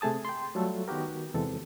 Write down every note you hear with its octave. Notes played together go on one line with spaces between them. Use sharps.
C3 A3 G#4 A5 D#6
G5 C6
F#3 G3 A3 F4 A4 E5
D#3 B3 F#4 G4 A#4
E2 C3 E3 G#3 A4